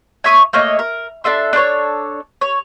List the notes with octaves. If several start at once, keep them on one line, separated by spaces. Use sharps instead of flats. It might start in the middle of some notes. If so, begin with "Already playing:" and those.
C#5 E5 C#6 D#6
A3 A#3 C#5 D#5
A#4
D4 A4 E5 C6
D4 A4 C5 C#5
C#5